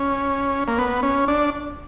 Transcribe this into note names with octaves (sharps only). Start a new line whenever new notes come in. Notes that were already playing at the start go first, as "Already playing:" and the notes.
Already playing: C#4
A#3
B3
C#4
D4